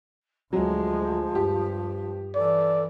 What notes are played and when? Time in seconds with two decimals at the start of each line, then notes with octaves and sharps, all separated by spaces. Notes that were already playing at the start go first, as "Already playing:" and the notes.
0.53 D2 F3 F#3 G#3
1.35 G2 G4
2.35 E3 A4 D5